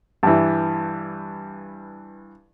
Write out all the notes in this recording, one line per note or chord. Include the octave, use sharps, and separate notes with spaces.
G2 E3